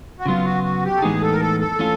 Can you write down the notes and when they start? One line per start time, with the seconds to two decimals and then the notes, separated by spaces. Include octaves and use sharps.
0.19 F#4
0.26 C#3 F#3 B3 F4
0.45 F#4
0.64 F#4
0.84 G4
0.97 A4
1.02 A2 E3 G#3 B3 D#4 G#4
1.22 A4
1.32 A#4
1.40 A4
1.60 A4
1.79 E3 A3 C#4 F4